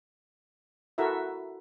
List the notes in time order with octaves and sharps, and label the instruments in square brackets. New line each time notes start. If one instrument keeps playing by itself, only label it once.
[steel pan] E4 F#4 A4 A#4 E5